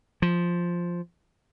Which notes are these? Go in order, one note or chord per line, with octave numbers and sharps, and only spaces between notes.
F3